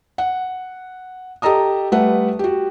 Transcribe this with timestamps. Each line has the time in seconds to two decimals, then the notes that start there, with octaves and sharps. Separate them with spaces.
0.18 F#5
1.42 G4 A4 D#5 A#5 D#6
1.92 G3 A3 B4 F#5
2.39 F#4 G4